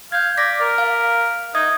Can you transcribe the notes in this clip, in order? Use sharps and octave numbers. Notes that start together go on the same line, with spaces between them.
F5 G6 G#6
D5 D6 A#6 B6
A#4
F5
D#4 E5 D#6 G#6